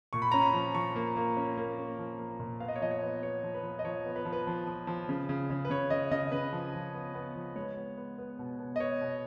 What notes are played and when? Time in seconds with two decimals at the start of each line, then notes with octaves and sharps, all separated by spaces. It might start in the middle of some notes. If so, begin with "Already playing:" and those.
0.13 A#2 C#6
0.22 B5
0.32 C#4 A#5
0.42 B5
0.54 F3
0.74 F3 C#6
0.96 A#3
1.17 A#3
1.37 C#4
1.58 A#3
1.78 C#4
1.99 F3
2.19 A#3
2.40 A#2
2.60 B3 F5
2.68 D#5
2.76 C#5
2.82 F3 D#5
2.91 C#5
3.02 B3
3.23 B3 C#5
3.43 F3
3.54 B4
3.63 F3
3.79 D#5
3.85 F3 C#5
4.05 B3
4.16 B4
4.25 F3
4.33 B4
4.47 F3
4.67 F3
4.87 F3
5.09 C#3
5.29 C#3
5.50 C#3
5.65 B4
5.70 C#3 C#5
5.90 C#3 D#5
6.11 C#3 D#5
6.32 C#3 B4
6.52 F3
6.74 F3
6.94 B3
7.15 B3
7.36 F3
7.56 G#3 C#5
7.77 B3
7.98 B3
8.18 B3
8.39 B2
8.59 B2
8.76 D#5
8.80 B3 C#5
9.01 B2